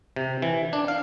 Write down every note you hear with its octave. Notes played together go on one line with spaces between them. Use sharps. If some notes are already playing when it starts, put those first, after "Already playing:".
C3
E3
D4
F5